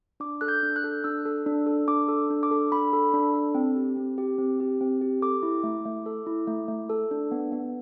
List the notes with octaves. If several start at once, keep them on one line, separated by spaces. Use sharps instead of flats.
D4 D6
A4 F#6
G6
D4
F#6
A4
D4 E6
A4
D4
A4
D4 D6
A4
D4
D6
A4
D4 B5
A4
D4
A4
C4
G4
C4
G4
C4
G4
C4
G4
A4 D6
E4
A3
A3
A4
E4
A3
A3
A4
D4
B3
B3